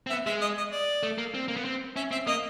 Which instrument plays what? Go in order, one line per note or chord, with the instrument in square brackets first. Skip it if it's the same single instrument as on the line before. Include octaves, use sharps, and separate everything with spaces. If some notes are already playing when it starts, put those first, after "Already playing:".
[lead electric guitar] C4
[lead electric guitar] B3 [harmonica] E5
[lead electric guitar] G#3 [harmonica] E5
[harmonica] D#5
D#5
D5
[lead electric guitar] A3
A#3
C4
A#3
B3
C4
[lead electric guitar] C#4 [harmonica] E5
[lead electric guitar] C4 [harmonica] E5
[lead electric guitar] A#3 [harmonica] D#5